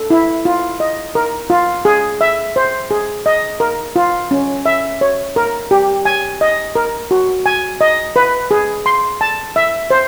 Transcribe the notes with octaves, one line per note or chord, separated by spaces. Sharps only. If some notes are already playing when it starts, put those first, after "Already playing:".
Already playing: A4
E4
F4
D#5
A#4
F4
G#4
E5
C5
G#4
D#5
A#4
F4
C#4
E5
C#5
A#4
G4
G#5
D#5
A#4
F#4
G#5
D#5
B4
G#4
C6
A5
E5
C5